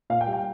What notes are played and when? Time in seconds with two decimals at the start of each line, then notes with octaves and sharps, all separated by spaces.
0.10 A#2 F5
0.21 G5
0.27 G3
0.33 G5